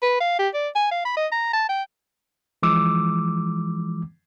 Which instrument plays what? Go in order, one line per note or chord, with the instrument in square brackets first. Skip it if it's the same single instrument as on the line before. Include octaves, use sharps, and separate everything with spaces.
[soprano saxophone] B4
F5
G4
D5
G#5
F5
B5
D#5
A#5
A5
G5
[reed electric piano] E3 F3 G#3 D6 E6